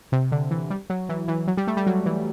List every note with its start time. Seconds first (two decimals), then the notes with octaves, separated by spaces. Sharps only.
0.12 C3
0.32 D3
0.51 E3
0.70 G3
0.90 F#3
1.09 E3
1.28 E3
1.47 F#3
1.57 G3
1.67 A3
1.77 G3
1.87 F#3
2.06 E3